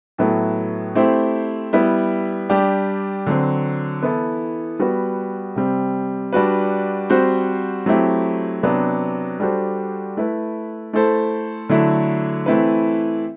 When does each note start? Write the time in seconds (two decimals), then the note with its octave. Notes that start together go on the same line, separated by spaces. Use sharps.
0.18 A2 F#3 B3 E4 A4
0.95 A3 C4 E4 G4 C5
1.73 G3 B3 E4
2.49 G3 D4 G4
3.26 D3 F#3 C4
4.03 E3 B3 E4 A4
4.79 G3 B3 F#4 B4
5.56 C3 G3 C4
6.33 G3 D4 F#4 B4
7.10 G3 C4 F#4 C5
7.86 F#3 A3 C4 E4 G4
8.63 C3 F#3 B3 D4
9.40 G3 D4 F#4 A4 C5
10.17 A3 E4 B4
10.93 A3 E4 A4 C5
11.69 D3 F#3 A3 E4
12.46 E3 A3 C4 E4 B4